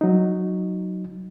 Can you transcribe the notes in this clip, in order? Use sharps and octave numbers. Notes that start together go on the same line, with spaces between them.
F#3 D#4